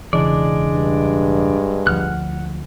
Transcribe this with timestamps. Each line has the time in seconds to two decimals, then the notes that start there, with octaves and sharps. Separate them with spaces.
0.13 E1 C#3 E3 G#3 D4 D5
0.72 G2
1.87 D2 F3 F#5 F6 F#6